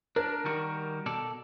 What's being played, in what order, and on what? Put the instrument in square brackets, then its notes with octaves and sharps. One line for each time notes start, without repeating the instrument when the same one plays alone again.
[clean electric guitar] D4 [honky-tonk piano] A#4
[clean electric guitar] D#3 G3 F#4
B2 A4 D5